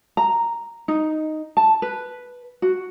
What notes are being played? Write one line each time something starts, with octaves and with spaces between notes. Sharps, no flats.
A#5
D#4
A5
B4
F#4